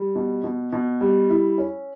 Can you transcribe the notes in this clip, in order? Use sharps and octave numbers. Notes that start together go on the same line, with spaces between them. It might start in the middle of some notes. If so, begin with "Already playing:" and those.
Already playing: G3
B2
B2
B2
G3
E4
C#4